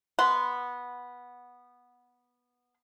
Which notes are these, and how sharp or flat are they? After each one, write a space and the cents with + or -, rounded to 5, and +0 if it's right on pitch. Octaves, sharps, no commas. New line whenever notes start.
B3 -10 F#5 +0 C6 -25